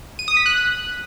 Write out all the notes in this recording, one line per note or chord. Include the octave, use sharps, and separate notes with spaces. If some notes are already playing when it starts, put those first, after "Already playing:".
D#7
D#6
B6
F#6